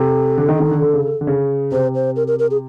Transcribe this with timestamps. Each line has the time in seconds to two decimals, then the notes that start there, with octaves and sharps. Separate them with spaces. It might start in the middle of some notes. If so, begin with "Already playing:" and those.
Already playing: C3 A4
0.37 D3
0.49 D#3
0.60 D#3
0.71 D3
0.82 D3
0.94 C#3
1.21 D3
1.27 C#3
1.72 C3 C5
1.95 C5
2.16 A#4
2.27 A#4
2.39 A#4
2.51 G#4